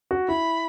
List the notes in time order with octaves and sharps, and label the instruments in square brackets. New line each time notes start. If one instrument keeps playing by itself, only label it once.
[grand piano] F#4
[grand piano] E4 [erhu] B5